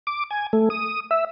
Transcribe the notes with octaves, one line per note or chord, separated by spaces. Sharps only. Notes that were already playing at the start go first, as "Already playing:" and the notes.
D6
G#5
A3
D#6
E5